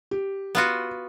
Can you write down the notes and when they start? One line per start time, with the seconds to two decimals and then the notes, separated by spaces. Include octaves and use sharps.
0.11 G4
0.55 B3 F4 F#4